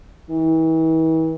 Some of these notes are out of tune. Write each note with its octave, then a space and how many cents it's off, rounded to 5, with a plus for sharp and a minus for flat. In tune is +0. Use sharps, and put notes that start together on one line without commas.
E3 -40